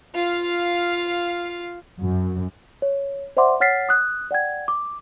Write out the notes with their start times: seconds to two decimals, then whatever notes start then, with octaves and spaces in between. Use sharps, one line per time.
0.15 F4 F5
1.99 F#2
2.82 C#5
3.37 C5 D5 E5 F#5 C6 D6
3.60 C#5 F#5 F6 A6 B6 C7
3.89 D#6 F#6
4.31 D5 F#5 G5 G#6
4.68 D6